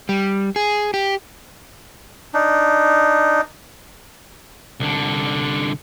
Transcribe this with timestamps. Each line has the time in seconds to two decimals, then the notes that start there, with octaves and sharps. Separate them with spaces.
0.09 G3
0.56 G#4
0.94 G4
2.34 D4 D#4
4.80 C2 D3